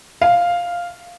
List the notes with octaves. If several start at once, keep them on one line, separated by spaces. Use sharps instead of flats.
F5